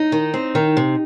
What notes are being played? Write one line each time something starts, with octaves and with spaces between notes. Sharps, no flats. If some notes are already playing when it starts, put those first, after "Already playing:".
Already playing: D#4
D#3
C4
D#3
C3